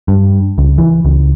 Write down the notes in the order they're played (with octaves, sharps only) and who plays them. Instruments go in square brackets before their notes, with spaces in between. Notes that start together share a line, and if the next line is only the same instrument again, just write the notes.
[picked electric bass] G2
C#2
E3
C#2